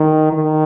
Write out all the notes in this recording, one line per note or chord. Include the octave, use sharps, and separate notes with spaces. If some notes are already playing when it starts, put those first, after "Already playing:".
Already playing: D#3
D#3